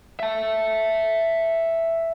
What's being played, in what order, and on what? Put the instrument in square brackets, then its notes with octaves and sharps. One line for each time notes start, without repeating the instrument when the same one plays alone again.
[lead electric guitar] E5 A5